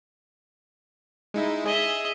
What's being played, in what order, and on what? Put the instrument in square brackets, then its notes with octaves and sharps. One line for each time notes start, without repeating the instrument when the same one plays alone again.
[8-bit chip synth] G#3 D#4 E4
[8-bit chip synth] G#4 [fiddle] D#5 E5